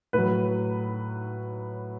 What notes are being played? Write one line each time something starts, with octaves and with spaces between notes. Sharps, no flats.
A2 F#3 B4